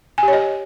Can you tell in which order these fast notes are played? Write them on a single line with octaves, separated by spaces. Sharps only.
G#5 G4 C#5 D#5